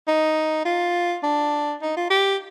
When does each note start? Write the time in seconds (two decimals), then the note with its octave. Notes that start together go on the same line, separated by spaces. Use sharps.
0.08 D#4
0.66 F4
1.23 D4
1.82 D#4
1.97 F4
2.10 G4